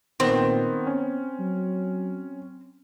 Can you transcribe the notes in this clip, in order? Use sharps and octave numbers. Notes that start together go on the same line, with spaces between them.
A#2 D#3 B3 C4
B3 C#4
F#3